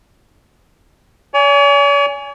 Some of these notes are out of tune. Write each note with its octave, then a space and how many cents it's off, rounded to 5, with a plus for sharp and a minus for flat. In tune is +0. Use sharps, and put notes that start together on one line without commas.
C#5 +45 G#5 +0